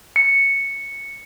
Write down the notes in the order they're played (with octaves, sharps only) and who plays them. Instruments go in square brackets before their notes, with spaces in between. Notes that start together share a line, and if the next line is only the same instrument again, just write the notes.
[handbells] C#7